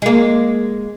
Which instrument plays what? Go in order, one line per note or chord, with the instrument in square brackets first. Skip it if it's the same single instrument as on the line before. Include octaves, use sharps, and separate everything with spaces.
[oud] G#3 A#3